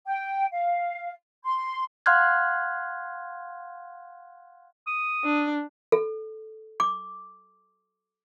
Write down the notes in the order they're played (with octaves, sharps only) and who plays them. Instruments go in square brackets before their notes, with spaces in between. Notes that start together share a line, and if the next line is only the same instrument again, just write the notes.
[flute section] G5
F5
C6
[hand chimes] F5 F#5 C6 F6 F#6 G#6
[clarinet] D#6
[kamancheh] D4
[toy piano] A4
D6